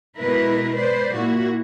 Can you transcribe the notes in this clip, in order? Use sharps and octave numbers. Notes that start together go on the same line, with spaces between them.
B2 G#3 E4 A#4 B4
B4 C5 D5
A#2 A#3 E4 F#4